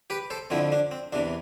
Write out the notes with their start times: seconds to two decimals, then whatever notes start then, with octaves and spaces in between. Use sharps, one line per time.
0.10 G4 B4
0.30 A4 C5
0.50 F2 D3 F3 C4 E4
0.72 D4
0.91 C4
1.13 E2 C3 E3 D4